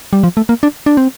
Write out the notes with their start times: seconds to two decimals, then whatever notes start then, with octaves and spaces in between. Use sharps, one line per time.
0.13 G3
0.24 F3
0.37 A3
0.49 A#3
0.63 D4
0.86 D4
0.97 C4